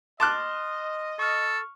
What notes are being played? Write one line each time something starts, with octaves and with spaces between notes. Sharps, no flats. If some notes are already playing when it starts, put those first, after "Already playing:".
D#5 A5 C6 D6 F6 F#6
A4 C#6 F6